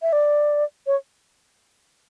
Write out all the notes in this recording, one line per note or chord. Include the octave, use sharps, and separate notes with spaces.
E5
D5
C#5